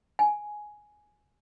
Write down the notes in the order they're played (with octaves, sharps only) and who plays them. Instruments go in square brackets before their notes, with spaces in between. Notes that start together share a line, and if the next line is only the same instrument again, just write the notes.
[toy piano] G#5